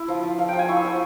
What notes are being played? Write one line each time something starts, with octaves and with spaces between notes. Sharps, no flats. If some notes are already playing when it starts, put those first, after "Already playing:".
Already playing: E4
F3
F3
F3 F5
F3 G5
G#5
E4 C#6
E6
F3 C#6